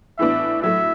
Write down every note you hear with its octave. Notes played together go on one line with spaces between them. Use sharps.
A2 E3 B3 D4 E5
A2 F#3 A3 E5